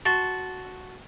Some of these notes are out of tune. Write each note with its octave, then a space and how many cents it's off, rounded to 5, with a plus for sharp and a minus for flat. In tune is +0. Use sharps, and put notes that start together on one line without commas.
F#4 +0 A5 -10 C6 +0